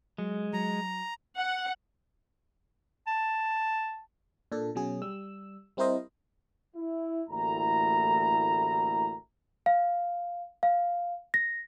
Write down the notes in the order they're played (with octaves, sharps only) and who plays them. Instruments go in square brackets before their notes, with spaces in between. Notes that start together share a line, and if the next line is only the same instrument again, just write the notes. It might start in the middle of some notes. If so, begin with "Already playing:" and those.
[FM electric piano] F#3 [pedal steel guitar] G#3
[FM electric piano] F#3 [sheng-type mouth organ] A#5
[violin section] F#5
[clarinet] A5
[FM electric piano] A#2 D4 A4
B2 F#3 C#4 G#4
G3 E6
G3 C4 E4 A#4 C5 D#5
[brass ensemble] E4
A1 D2 A#3 E4 A#5
[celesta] F5
F5
A#6